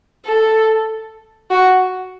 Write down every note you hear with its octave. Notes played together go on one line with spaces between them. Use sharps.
A4
F#4